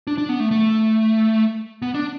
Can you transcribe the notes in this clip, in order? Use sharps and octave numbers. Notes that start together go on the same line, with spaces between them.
D4
D4
B3
A3
A3
B3
D4